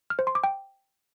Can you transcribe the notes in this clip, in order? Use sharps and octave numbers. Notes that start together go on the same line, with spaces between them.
F6
C5
C6
D6
G5